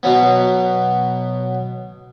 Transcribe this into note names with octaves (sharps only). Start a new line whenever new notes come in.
B2 F#3 B3